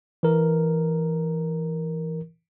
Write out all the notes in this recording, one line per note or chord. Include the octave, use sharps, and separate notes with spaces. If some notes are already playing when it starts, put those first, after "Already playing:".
E3 A#4